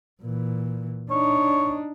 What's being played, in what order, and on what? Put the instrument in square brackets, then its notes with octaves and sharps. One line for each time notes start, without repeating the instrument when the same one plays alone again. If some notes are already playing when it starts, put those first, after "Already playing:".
[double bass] A#2 E3
[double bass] D4 D#4 [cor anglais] C#5